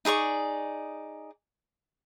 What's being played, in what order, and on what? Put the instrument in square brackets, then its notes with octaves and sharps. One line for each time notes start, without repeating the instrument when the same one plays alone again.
[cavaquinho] D#4 G#4 D5 C#6